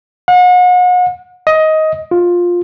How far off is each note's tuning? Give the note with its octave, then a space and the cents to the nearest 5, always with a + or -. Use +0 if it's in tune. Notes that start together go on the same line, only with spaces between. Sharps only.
F#5 -40
D#5 +15
F4 +10